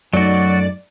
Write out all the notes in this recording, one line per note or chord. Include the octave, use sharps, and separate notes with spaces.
F#2 F#3 A3 D#4 F#4 D5